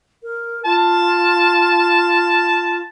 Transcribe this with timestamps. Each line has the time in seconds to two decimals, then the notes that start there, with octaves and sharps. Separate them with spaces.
0.23 A#4
0.65 F4 A5